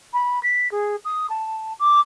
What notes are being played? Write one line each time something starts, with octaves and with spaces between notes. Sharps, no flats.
B5
B6
G#4
D#6
A5
D6